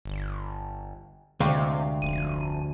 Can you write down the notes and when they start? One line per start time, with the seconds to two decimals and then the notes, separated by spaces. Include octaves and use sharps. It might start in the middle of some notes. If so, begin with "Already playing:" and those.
0.05 G1
1.40 D2 C3 G#3 F5 G5
2.02 F1 D#7